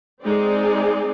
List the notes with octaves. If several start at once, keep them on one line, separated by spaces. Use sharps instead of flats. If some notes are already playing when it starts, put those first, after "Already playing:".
G#3 C4 D#4 G#4 D5